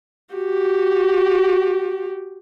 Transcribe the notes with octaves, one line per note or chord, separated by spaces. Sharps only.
F#4 G4